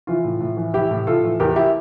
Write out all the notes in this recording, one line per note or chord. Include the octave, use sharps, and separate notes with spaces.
E3 F4
A2
A2
E3
E3 E4 G4
A2
A2 F4 A4
E3
E2 G4 A#4
E4 G4